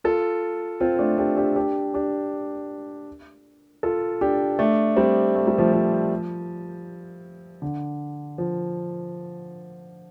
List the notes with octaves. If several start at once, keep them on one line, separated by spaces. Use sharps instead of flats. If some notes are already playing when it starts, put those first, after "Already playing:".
F4 A4
C4 F4
A3 D4
D4 G4
D4 G4
D4 G4
D4 G4
F4 A4
D4 G4
A3 D4
G3 C4
A3
G3
F3 A3
F3
D3
F3